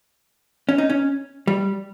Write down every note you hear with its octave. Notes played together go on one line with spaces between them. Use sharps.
C#4
D#4
C#4
G3